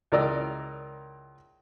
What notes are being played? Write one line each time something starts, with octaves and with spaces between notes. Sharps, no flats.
C#2 E3 A#4 D5 D#5 E6